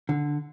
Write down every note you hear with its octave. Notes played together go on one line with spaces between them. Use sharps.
D3